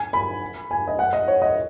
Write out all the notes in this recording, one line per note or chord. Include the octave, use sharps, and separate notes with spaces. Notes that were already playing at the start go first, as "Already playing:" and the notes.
Already playing: G#5
B5
G#5
D#5
F#5
D#5
C#5
D#5